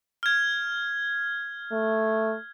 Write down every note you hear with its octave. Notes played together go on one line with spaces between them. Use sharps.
F6 G#6
A3